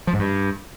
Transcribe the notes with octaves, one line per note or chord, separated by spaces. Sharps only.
F3
G#2
G2